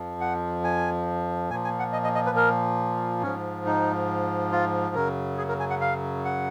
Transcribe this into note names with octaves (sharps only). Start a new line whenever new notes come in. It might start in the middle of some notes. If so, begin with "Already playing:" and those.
Already playing: F2 F3
F#5
G#5
A#2 F3 G#5
G#5
F#5
D#5
D#5
D#5
B4
A#4
G#2 F3 C#4
D#4
F4
F#2 C#3 F#3 A#4
G#4
A#4
G#5
F#5
F5
F#5